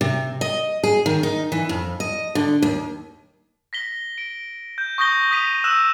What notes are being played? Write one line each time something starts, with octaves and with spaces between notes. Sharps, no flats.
C3
D#5
G#4
D#3
D#4
E3
F2
D#5
D3
D#2
A#6 B6 G7
D7
G6
C#6 D#6 G6 A#6 G7
D#6 A#6 B6 D#7 F7
D#6 E6 F#6 E7